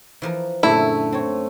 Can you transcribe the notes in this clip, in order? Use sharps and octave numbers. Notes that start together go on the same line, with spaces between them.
E3 F3 A#4
F#2 A#2 D3 A3 E4
C4 C#5